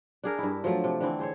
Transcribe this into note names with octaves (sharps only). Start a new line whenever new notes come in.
D4 G#4 A#4
G2 E4
F3 F#3 A3
C3
D3 E3 C4
G#4 C5 C#5